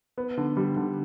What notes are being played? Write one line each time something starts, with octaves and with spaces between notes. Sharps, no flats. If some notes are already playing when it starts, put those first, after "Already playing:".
B3
D3
G3
D3